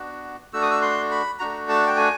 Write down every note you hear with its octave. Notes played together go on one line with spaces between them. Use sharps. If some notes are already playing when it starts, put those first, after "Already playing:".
Already playing: B3 D4 F#4
A3 D4 F#4 E6
D#6
E6
C6
B5
A3 D4 F#4 A#5
A5
G5
G#5